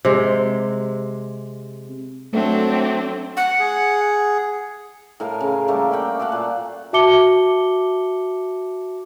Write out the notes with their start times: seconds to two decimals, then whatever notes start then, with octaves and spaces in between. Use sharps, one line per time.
0.05 C3 G#3
2.33 F#3 A3 C4 D4
3.37 F#5
3.59 G#4
5.20 A2 A#4 F5 A5
5.41 C#3
5.68 G3 A3 A#3 G4
5.92 G4 F#5 G5 D6
6.19 A4 D5 F5 F#5
6.32 A#2
6.93 F#4 E5 A5 D6 C#7 G7